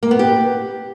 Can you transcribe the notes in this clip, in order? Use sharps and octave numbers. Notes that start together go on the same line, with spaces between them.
A#3
B3
G4